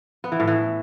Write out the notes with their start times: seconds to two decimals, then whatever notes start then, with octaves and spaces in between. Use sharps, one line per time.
0.24 B3
0.32 E3
0.40 A2
0.47 E3